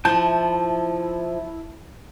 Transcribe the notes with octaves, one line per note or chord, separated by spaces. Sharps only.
F3 E4 A5 G6